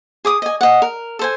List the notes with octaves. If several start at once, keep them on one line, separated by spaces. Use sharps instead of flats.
G#4 D6 D#6
D#5 G#5
D#5 F#5
A#4
A4 C5 G#5